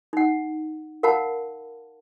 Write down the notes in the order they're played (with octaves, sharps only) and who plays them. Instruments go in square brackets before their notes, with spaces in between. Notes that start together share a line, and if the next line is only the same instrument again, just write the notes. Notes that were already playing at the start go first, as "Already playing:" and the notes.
[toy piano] D#4 F#5
A#4 F5 F#5 A5 B5